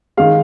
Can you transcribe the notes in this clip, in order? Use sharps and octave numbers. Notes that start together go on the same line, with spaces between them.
D#3 G#3 F5